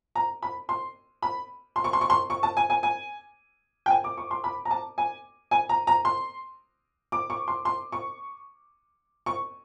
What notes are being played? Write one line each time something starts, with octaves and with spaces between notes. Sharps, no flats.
A#5
B5
C6
B5
C6
C#6
C6
C#6
C6
C#6
A5
G#5
G#5
G#5
G5
G#5
D6
C#6
C6
B5
A#5
A5
G#5
G#5
A#5
A#5
C6
D6
C#6
C6
C6
C#6
C#6